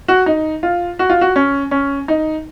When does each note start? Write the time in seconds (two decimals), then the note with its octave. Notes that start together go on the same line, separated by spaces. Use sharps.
0.08 F#4
0.26 D#4
0.63 F4
0.99 F#4
1.10 F4
1.21 F#4
1.36 C#4
1.71 C#4
2.08 D#4